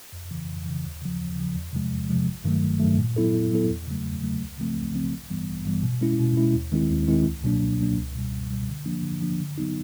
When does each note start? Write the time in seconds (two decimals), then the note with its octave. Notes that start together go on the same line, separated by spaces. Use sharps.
0.12 F2
0.31 C#3 E3
0.49 F2
0.66 C#3 E3
0.84 D#2
1.02 C#3 F3
1.20 D#2
1.37 C#3 F3
1.56 E2
1.73 C3 F3 G#3
1.91 E2
2.10 C3 F3 G#3
2.26 G1
2.44 G2 D#3 F#3 A3
2.62 G1
2.80 G2 D#3 F#3 A3
2.98 A#2
3.16 F#3 B3 E4 A4
3.34 A#2
3.52 F#3 B3 E4 A4
3.70 E2
3.87 C#3 F#3 A3
4.05 E2
4.22 C#3 F#3 A3
4.40 C#2
4.58 C#3 F3 A3 C4
4.76 C#2
4.94 C#3 F3 A3 C4
5.12 A1
5.29 G2 E3 G3 B3
5.48 A1
5.65 G2 E3 G3 B3
5.83 B2
6.01 G#3 C#4 E4
6.19 B2
6.37 G#3 C#4 E4
6.55 D#2
6.72 D#3 G#3 C4 E4
6.89 D#2
7.08 D#3 G#3 C4 E4
7.25 C#2
7.44 B2 F#3 A#3 D4
7.61 C#2
7.80 B2 F#3 A#3 D4
7.97 C#2
8.15 B2 G3
8.33 C#2
8.50 B2 G3
8.69 D3
8.86 F3 A#3 D4
9.03 D3
9.22 F3 A#3 D4
9.39 D3
9.58 F#3 B3 D#4